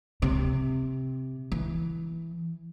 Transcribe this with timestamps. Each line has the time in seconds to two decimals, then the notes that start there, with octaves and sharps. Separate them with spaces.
0.22 C3
1.52 E3